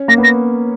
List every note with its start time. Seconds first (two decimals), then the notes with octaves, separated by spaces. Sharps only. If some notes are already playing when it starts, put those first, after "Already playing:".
Already playing: C#4
0.08 A#3 A#6
0.18 B3
0.23 A#6